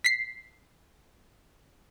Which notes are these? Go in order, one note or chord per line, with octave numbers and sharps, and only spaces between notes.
B6 C7